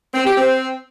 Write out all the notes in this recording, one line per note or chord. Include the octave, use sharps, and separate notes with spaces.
C4
G4
C4